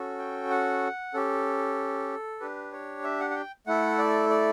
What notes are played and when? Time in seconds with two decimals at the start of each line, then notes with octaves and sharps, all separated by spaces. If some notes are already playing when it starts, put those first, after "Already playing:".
Already playing: C#4 F#4 A4
0.19 G5
0.50 F#5
1.14 C#4 G4 A4
2.40 D4 G4 B4
2.72 C#5
3.04 E5
3.20 F#5
3.30 F#5
3.35 G5
3.67 A3 E4 A4 F#5
3.98 D5
4.30 D5